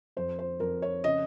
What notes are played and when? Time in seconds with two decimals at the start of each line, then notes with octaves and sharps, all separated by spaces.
0.17 F2 C5
0.39 C5
0.60 F2 A#4
0.82 C#5
1.04 C#3 D#5